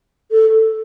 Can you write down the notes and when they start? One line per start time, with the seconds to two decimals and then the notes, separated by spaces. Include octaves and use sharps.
0.31 A4